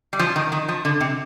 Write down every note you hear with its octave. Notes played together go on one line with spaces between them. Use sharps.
G3
F3
D#3
D#3
F3
D3
C3